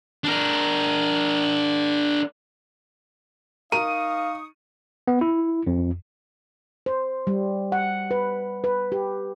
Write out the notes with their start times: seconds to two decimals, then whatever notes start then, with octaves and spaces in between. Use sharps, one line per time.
0.24 D4 A#4
3.72 D#4 A#4 F5 C#6 D#6 D#7
5.08 B3
5.21 E4
5.67 F2
6.86 C5
7.27 G3
7.72 F#5
8.11 B4
8.64 B4
8.92 G4